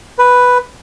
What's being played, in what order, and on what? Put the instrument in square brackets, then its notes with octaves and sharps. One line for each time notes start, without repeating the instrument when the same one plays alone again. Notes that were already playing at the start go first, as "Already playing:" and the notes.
[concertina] B4